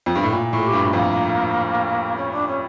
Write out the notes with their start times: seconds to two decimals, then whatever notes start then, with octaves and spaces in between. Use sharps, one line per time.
0.06 F2
0.15 G2
0.23 A2
0.32 A#2
0.53 A2 A4
0.63 G4
0.73 G2
0.93 F2 A#3
2.16 C#4
2.31 D4
2.47 C#4